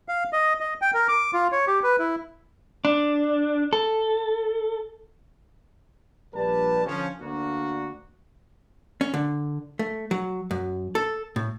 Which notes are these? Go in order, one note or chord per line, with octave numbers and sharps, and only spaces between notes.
F5
D#5
D#5
G5
A#4
D6
F4
C#5
G4
B4
E4
D4
A4
A#1 G3 B4 A5
D3 F3 C#4
D2 A#3 D4 F#4
C#4
D3
A3
F#3
F#2
A4
A2